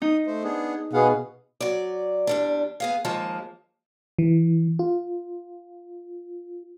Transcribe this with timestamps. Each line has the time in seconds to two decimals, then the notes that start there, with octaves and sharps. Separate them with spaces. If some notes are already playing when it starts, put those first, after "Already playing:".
0.02 D#4 D#6
0.27 A3 C5
0.44 B3 D4 G#4
0.93 B2 B3 G#4 F5 F#5
1.60 F#3 D5
2.27 E2 G3 D4
2.80 B3 G#4 F5
3.05 D#2 F3 G#3 A#3 A5
4.19 E3
4.79 F4